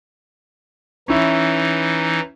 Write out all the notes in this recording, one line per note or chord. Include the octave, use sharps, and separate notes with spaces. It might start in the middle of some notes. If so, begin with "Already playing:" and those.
E3 C#4 D#4 E4